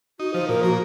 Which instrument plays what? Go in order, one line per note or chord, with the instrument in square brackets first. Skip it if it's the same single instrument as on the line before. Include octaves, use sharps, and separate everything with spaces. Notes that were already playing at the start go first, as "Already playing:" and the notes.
[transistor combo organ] D#4 [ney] F#4
[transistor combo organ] F3 [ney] C5
[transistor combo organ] A#2 [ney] A#4
[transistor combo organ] A#3 [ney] F#4